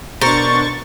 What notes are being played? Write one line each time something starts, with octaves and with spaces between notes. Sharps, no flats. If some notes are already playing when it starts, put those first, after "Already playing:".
B2 D4 A#4 C5 C#6 A6